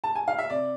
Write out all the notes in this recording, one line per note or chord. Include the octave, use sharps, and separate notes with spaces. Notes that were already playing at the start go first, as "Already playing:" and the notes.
A5
G#5
F5
E5
C3 D5